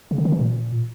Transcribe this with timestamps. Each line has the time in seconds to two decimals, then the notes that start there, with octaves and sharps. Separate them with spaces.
0.11 C#3
0.18 D3
0.25 D#3
0.32 E3
0.39 A#2